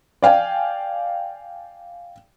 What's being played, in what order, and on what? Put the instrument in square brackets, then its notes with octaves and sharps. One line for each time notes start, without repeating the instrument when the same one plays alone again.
[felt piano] D5 F5 G5 G#5